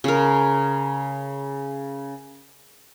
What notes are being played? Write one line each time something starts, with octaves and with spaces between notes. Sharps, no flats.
C#3 A#4